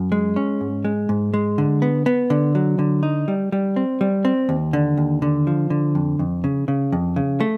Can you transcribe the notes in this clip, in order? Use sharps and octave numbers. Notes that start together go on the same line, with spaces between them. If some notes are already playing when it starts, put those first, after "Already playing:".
Already playing: F#2
G#3
C#4
G#2
G#3
G#2
G#3
D3
B3
B3
D3
F#3
D3
D#4
G3
G3
C4
G3
C4
D#2
D3
D#2
D3
F3
D3
F2
F2
C#3
C#3
F2
C#3
A3